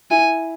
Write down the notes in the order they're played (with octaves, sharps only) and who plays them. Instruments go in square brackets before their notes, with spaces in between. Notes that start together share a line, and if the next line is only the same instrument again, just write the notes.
[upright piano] E4 [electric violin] G#5